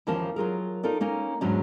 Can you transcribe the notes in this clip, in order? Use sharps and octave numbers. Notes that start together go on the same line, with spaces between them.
D#2 E3 F3 A#3 C#4 A5
F#3 F4 G#4 A#4
D#4 F4 A4 A#4 D5
A#3 C#4 D#4
E2 G#2 F#3 C#4 D4